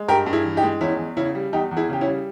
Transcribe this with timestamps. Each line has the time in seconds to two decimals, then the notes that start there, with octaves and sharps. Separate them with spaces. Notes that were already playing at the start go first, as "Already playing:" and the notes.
Already playing: G#3
0.08 G2 G4 A#4
0.26 G2
0.33 E4 G#4
0.45 E3
0.57 D#4 G4
0.63 G#3
0.81 E2 C#4 E4
0.99 E2
1.17 C#3 C#4 E4
1.35 G3
1.53 E2 D#4 G4
1.71 E2
1.77 E4 G#4
1.89 C#3 G4
2.01 C#4 E4
2.07 G3